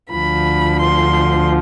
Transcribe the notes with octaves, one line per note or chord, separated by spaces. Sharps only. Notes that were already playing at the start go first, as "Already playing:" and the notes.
D2 D3 F3 B5
C6